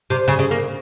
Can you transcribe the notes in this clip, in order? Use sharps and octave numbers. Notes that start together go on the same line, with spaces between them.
C3
C#3
C#3
A#3